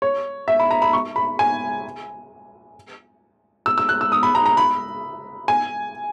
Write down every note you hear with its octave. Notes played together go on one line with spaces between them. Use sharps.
C#5
E5
B5
A#5
B5
C#6
B5
G#5
E6
E6
F#6
E6
D#6
B5
A#5
A#5
B5
G#5